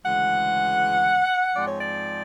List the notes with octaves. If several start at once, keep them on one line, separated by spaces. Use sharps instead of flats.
D2 C#3 E3 G#3 F#5
G#2 F3 G#3 C4 D5
C#5
D5